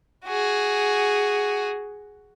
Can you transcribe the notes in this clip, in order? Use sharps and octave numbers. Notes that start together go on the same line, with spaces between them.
F#4 G#4